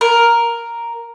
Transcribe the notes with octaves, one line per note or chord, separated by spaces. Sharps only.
A#4